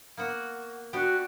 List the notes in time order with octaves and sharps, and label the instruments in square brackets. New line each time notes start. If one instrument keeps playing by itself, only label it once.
[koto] A#3 B3 F#4
[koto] B3 D4 G4 [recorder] F#4